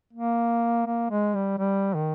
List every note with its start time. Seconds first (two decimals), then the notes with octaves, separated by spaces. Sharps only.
0.13 A#3
0.86 A#3
1.11 G#3
1.35 G3
1.59 G3
1.95 D#3